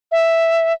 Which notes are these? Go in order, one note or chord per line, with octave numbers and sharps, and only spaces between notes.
E5